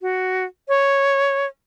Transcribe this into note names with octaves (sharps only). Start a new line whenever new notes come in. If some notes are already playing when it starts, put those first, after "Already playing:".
F#4
C#5